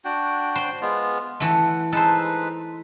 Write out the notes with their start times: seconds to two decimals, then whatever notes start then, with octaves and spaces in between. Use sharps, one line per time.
0.05 D4 F#4 G5
0.56 C5
0.82 G#3 B3 F4
1.40 E3 A3 F#5
1.92 G#3 D#4 A4 B4 C5